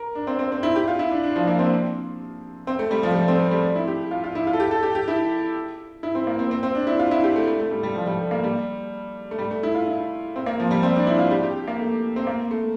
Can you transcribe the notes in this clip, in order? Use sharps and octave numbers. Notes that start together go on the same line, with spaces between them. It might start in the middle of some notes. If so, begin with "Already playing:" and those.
Already playing: A#4
D4
C4
C4
C4
E4
G4
F4
E4
D4
D4
F3
A#3
C4
C4
A3
G3
F3
G3
A3
C4
A3
G3
A3
E4
G4
F4
F4
E4
F4
A4
G4
A4
G4
G4
E4
E4
C4
A#3
C4
C4
C4
D4
E4
F4
E4
G4
A3
A3
A3
G3
G3
F3
G3
A3
A#3
G3
A3
G3
A3
E4
F4
E4
C4
A#3
F3
G3
C4
D4
E4
F4
G4
G4
A#3
A3
C4
A#3
A3